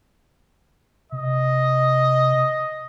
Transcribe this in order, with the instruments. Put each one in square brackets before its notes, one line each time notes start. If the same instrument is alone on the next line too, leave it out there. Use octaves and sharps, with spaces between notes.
[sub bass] C3 [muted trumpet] D#5